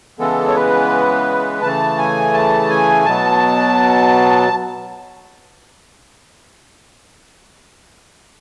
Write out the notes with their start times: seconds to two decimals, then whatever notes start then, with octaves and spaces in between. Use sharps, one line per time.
0.19 C#3 E3 G#3 B3 A4
0.48 C#5
0.55 B4
1.62 C#3 E3 A3 A5
1.98 G#5
2.33 A5
2.70 G#5
3.05 B2 F#3 B3 A5